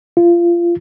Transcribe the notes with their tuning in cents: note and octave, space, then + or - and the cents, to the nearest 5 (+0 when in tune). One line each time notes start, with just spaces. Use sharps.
F4 -25